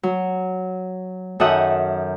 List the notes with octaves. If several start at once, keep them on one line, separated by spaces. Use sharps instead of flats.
F#3
F#2 D#3 A4 E5 F#5 D#6